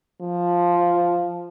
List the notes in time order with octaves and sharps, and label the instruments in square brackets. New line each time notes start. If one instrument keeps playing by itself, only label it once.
[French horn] F3